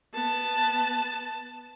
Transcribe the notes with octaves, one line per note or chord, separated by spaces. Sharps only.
B3 A5